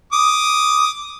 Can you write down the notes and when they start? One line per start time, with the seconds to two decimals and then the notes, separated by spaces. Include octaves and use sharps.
0.13 D6 D#6